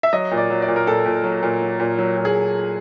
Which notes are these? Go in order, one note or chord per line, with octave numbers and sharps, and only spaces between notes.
E5
F#3 D#5
A#2
D5
F#3
D5
A#2
A#4
A#2 A4
A#2
F#3
A#2
F#3
A#2
F#3
A#2
G#4